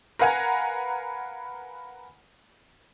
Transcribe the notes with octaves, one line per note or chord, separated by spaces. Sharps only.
A#4 B4 F5 F#5 G#5 A#5